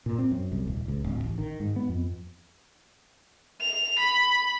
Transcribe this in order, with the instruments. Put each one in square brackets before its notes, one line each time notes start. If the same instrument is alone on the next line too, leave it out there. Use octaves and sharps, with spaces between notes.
[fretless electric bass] A#2
C4
F#2
C2
D#1
C#2
D1
A1
D#3
G#2
B3
F2
[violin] F7
B5